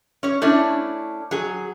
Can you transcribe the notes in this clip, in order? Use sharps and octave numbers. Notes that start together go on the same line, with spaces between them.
C#4 C#5
A3 C#4 D4 E4
F#3 G#4